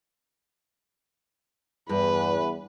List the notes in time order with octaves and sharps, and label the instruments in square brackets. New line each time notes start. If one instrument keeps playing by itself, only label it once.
[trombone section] E2 [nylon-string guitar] G2 [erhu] B4